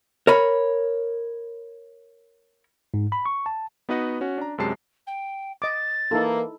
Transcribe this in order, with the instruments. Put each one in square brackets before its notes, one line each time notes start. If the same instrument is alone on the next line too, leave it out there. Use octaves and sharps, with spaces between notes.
[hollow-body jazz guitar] A#4 C#5 B5
[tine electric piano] G#2
B5
C#6
A5
[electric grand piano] B3 D#4 F#4 B4 D#5 F#5
C#4 F#4
D4 A#5
F#2 C3 G#3 A5 C7
[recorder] G5
[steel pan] D#5 D6 [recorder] A6
[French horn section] E3 A#3 [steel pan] D#4 E4 A4